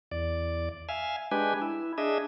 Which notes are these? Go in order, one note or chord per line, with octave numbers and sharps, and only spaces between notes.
E2 D5
E5 F5 G#5
G#3 D4 G4 B4 G#5
E4
D4 G#4 D#5 E5